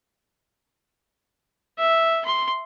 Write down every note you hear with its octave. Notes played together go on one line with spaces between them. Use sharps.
E5
C6